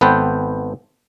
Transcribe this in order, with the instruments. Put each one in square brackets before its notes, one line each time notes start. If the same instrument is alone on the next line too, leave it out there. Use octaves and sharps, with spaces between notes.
[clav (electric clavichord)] G#1 B3 A4 B4 C5 G5